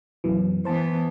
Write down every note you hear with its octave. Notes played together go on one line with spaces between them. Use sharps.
F#2 B2 E3
E3 B3 C5 A5